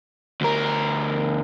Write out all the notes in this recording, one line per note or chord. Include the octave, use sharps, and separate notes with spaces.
D2 A#4